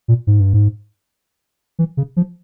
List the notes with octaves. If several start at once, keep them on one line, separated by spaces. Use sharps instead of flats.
A#2
G#2
G2
G#2
E3
C#3
F3